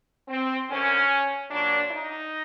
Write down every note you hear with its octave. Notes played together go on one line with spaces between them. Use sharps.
C4
F#2 D3 F#3 C#4
A#2 F#3 D4
D#4